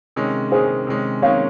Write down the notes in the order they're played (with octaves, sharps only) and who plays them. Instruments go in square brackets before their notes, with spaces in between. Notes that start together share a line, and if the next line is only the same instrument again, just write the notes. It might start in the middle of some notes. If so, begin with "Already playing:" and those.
[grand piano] C3 D#3 G#3 C#4
[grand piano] C3 D#3 G#3 C#4 [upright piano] G#4 C5
[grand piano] C3 D#3 G#3 C#4
[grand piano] C3 D#3 G#3 C#4 [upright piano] C#5 F5